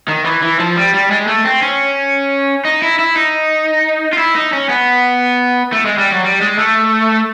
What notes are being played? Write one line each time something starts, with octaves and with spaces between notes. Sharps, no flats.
D#3
E3
E3
F3
G3
G3
G#3
A3
C4
C#4
D#4
E4
E4
D#4
F4
E4
D#4
C#4
B3
A3
G#3
G3
F#3
G3
G#3
A3